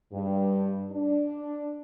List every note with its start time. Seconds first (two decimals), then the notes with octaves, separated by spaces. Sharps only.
0.13 G2
0.92 D4